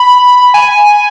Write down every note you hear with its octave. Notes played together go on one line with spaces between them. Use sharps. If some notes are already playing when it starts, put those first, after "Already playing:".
Already playing: B5
G#5